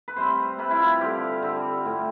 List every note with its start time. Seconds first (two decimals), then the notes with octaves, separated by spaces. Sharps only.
0.08 B4
0.17 C3 G3 C4 C5
0.58 C3 G3 C4 B4
0.70 E4
0.80 F4
1.00 D3 G3 C4 G4
1.42 D3 G3 C4
1.85 A2 G3 C4